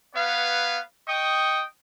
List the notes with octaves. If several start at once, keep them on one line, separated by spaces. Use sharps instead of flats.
B3 B4 C#5 F5
D#5 G5 C#6 D#6